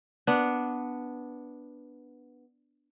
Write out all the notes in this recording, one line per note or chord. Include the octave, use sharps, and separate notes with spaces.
B3 D4